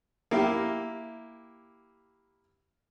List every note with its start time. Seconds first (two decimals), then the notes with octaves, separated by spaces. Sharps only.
0.31 A#3 E4 G4